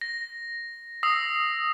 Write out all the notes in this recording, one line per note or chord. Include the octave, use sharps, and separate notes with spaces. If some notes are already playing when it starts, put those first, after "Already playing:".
A#6
D#6 E6 A#6 C7